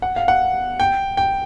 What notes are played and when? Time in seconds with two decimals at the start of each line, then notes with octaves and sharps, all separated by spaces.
0.02 F#5
0.16 F5
0.28 F#5
0.80 G5
1.17 G5